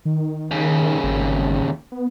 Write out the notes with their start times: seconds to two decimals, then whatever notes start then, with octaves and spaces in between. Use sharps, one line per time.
0.05 D#3
0.51 D#2 C#3
1.04 G#1
1.92 B3